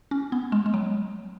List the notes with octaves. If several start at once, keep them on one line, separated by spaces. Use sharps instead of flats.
C#4
B3
G#3
G#3
F#3